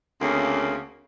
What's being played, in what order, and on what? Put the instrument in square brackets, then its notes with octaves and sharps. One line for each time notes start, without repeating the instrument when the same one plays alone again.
[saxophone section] D2 C#3 A#3 C4 C#4